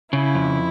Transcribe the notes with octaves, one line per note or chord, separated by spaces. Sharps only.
C#3 E4
F2